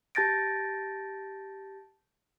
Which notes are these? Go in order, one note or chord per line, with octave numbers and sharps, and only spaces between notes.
G4 A5 G6 A6 A#6 D7